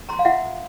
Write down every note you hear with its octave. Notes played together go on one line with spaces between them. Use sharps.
A#5 C6
F5
F4 E5 F#5